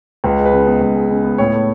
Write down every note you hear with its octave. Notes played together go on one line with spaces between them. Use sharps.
C#2 B4
G#3
B4
C#3
B3
C#2
G#3
C#3
B3
A2 C#5
A3